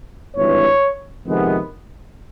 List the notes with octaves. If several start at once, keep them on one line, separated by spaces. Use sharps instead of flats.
G#1 G2 E3 C#5
F2 C3 D#3 G#3 B3